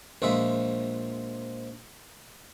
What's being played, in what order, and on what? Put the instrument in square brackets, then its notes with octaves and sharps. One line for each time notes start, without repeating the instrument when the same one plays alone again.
[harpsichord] A#1 F3 G#3 E5